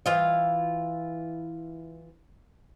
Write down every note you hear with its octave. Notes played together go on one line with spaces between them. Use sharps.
E3 F4 D#5